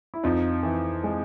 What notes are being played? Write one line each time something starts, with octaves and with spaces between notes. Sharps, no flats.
E4
F2 D#4 F4
E3
G#3